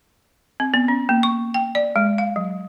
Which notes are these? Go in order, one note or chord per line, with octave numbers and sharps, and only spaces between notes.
C4
B3
C#4
A#3
C#6
G5
D5
G#3
F5
F#3